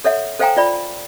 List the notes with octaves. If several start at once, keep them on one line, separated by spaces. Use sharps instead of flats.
A4 C#5 E5 F#5
A4 C5 F5 G5 G#5 A#5
F4 D5 B5